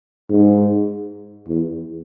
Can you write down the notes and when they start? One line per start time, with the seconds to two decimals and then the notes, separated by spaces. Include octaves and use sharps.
0.30 G#2
1.48 E2